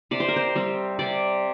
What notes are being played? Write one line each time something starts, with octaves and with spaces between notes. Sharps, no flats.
C3 D5
C5
A#4
C5
G3 C4
C3 D5